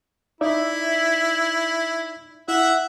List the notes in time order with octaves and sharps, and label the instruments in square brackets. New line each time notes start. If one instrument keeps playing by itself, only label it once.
[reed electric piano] D#4 D5 E5 [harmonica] E4
[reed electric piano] E4 [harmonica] E5 F#5